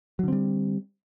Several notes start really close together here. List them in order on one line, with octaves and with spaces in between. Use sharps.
F#3 D3 C4 G3